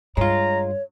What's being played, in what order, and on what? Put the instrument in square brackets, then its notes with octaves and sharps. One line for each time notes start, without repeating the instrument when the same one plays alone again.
[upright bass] G2 [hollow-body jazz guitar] G#3 F4 [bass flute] C#5 [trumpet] A#5